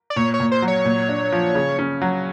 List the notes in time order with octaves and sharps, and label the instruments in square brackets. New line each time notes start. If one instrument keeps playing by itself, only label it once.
[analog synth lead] D5
[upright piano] A#2 [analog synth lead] C#5
[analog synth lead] C#5
[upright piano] A#2
[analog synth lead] C5
[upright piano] F#3
[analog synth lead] C#5
[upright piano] A#2
D4
F3
C#3
C#4
F#3